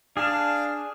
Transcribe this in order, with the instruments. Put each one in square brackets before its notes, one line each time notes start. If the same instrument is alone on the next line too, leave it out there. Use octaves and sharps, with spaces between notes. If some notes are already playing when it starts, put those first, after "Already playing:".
[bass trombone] D4 [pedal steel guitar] G#4 A5 [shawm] F5